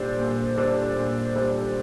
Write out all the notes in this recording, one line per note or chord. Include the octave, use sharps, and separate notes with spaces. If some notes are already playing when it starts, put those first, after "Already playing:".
Already playing: A#2 G3 D4 A4 C5
A#2
G3 D4 A4 C5
A#2
G3 D4 A4 C5